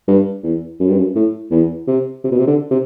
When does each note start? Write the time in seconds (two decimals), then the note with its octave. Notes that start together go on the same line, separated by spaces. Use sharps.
0.08 G2
0.43 E2
0.80 F#2
0.89 G2
0.98 F#2
1.15 A2
1.51 E2
1.87 C3
2.24 C3
2.31 B2
2.39 C3
2.47 D3
2.71 C3